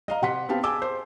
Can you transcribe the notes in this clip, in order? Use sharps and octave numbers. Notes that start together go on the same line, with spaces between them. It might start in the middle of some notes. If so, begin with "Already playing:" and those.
D#5 F5 A#5
C3 F#5 C6 B6
B3 C4 G4 F5 A5
G#4 G#5 A5 D6 E6
C5